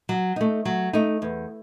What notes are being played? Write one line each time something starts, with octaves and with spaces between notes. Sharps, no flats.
F#3
A3 D#4
F#3
A3 D#4
E2